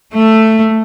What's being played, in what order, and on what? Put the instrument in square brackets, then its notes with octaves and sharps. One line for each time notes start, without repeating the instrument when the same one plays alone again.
[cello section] A3